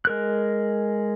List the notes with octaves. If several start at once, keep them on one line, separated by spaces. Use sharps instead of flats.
G#3 A#4 F#6